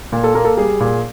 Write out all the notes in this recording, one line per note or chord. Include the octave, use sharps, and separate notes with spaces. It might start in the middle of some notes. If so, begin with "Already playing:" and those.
A#2
A4
A#3 A#4
A4
G3 G#4
A#2